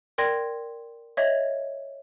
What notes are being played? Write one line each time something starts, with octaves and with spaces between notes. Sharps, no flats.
A#4 D5 G5 C6 G#6 A#6
C#5 D#5 E5 G#6